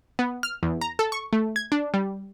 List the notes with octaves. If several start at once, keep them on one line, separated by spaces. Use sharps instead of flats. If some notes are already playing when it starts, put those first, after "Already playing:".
B3
F6
E2
A#5
A4
C#6
A3
G#6
D4
G3